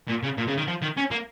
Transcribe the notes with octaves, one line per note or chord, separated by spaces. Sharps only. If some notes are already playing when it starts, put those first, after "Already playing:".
A#2
C#3
A#2
C#3
D#3
F3
D#3
C#4
A#3